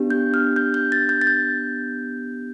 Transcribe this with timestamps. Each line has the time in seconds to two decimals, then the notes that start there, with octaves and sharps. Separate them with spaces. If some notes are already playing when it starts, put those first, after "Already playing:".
Already playing: B3 D4 G4
0.10 G6
0.34 F6
0.56 G6
0.74 G6
0.92 A6
1.09 G6
1.22 A6
1.27 G6